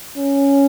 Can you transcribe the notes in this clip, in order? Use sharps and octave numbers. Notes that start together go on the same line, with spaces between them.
C#4